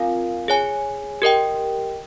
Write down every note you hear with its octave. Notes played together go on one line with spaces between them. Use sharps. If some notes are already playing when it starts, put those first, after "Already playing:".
Already playing: C4 F4 A#4 F5 G#5
G#4 C#5 G#5
G4 A#4 D#5 G5